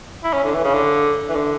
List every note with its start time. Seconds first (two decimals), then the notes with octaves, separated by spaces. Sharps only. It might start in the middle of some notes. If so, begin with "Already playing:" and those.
0.24 E4
0.33 C#4
0.44 D3
0.55 E3
0.64 C#3
0.74 D3
1.29 E3
1.35 D3